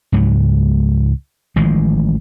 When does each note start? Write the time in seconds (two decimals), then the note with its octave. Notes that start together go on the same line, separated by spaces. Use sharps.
0.12 C#2 G#2 F#3
1.56 A1 D#3 F3 G#3